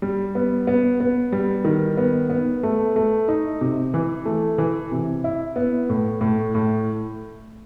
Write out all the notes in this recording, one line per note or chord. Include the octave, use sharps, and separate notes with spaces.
G3
B3
B3
B3
G3
D#3
B3
B3
A3
A3
D#4
C3
E3
A3
E3
C3
E4
B3
A2
A2
A2